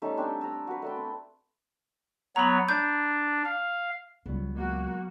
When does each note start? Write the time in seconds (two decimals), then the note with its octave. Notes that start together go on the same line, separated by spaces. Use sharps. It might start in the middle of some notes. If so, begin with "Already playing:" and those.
0.02 G3 A3 C#4 D#4
0.17 C4 D4 G5 E6
0.41 A#5 E6
0.67 F#4 B4
0.82 A3 D5 G5
0.96 C4
2.36 F#3 B3 C#5 A#5 B5
2.68 D4 G6
3.45 F5
4.26 C#2 C#3 F#3 G3 B3
4.56 G#3 A#3 F#4